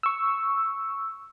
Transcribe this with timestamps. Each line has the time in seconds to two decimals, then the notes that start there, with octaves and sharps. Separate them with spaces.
0.03 C#6 E6